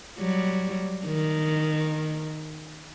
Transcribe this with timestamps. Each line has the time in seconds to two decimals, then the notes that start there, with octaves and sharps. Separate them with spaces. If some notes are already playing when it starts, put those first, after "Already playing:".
0.19 F#3 G3
1.06 D#3